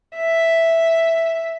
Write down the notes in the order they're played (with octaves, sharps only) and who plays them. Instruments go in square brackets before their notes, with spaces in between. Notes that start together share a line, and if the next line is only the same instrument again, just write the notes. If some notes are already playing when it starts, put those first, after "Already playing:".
[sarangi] E5